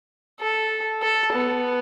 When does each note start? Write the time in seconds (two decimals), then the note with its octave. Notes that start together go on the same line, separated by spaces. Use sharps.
0.40 A4
1.02 A4
1.33 B3